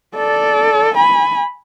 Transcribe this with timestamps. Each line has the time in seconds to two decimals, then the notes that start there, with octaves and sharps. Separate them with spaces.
0.16 A4 D5
0.95 G#5 B5